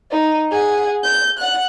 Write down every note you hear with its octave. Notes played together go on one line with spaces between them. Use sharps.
D#4
G#4 F#5
G6
F#5 F#6